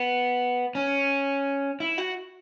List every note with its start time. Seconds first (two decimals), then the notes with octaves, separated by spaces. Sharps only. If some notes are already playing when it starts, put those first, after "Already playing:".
Already playing: B3
0.75 C#4
1.80 E4
1.98 F#4